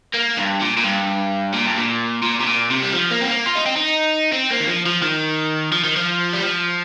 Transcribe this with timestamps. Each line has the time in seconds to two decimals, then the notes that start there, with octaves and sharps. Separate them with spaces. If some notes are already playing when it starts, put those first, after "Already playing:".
0.14 A#3
0.37 G2
0.61 A#2
0.77 A#2
0.84 G2
1.54 A#2
1.66 G2
1.77 A#2
2.23 A#2
2.41 C3
2.47 A#2
2.71 C3
2.83 G3
2.93 F3
3.11 A#3
3.21 C4
3.28 A#3
3.46 F4
3.55 D#4
3.66 C4
3.76 D#4
4.32 C4
4.51 A#3
4.60 D#3
4.67 F3
4.86 F3
5.02 D#3
5.72 F3
5.84 D#3
5.96 F3
6.33 G3
6.43 F3